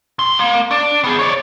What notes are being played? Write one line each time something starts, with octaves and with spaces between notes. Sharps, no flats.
C2 C6
A#3
D4 D5
B3 G#4
C#5 D5